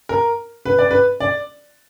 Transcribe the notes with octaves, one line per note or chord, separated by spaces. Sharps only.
A#4
B4
D5
B4
D5